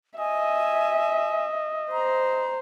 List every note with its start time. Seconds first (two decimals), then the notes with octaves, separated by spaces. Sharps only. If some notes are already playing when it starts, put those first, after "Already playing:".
0.19 D#5 E5 G#5
1.92 C5 A#5